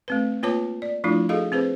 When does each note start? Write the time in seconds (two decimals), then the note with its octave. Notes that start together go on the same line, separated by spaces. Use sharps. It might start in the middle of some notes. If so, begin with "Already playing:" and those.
0.08 A3 C4 B4
0.43 A#3 F4 B4 C#5 A5 D6
0.82 D5
1.04 F3 A3 D4 E4 F4
1.29 F#4 G#4 A4 D#5 F5
1.52 C4 G#4 B4 C5